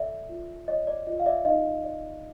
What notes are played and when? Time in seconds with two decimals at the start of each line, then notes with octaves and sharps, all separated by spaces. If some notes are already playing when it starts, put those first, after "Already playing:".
Already playing: A4 D5 E5
0.29 F4
0.68 C#5 D#5
0.87 D5
1.07 F4 D#5
1.20 F5
1.26 D5 E5
1.45 D#4 D#5 F5
1.84 D5